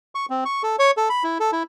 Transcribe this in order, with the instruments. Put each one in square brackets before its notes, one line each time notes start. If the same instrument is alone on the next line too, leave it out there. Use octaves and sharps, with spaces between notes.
[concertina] C#6
C4
C#6
A4
C#5
A4
B5
E4
A4
E4